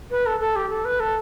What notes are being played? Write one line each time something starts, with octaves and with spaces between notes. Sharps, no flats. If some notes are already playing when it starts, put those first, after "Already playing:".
B4
A4
A4
G4
A4
B4
A4